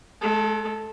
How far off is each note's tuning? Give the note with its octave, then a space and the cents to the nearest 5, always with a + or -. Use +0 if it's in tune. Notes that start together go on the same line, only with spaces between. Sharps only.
G#3 +40 A4 +0